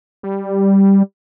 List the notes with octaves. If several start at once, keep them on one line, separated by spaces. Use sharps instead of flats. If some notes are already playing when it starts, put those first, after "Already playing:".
G3